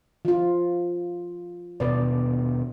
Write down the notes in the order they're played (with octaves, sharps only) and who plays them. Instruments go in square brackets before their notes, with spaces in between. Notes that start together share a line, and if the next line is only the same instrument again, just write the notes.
[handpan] F3 F4
[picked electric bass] D#1 B2 B3 [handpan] D5